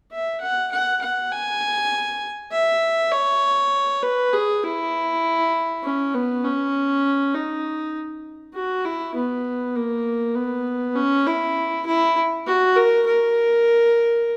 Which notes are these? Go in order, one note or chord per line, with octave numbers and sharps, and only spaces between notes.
E5
F#5
F#5
F#5
G#5
E5
C#5
B4
G#4
E4
C#4
B3
C#4
D#4
F#4
E4
B3
A#3
B3
C#4
E4
E4
F#4
A#4
A#4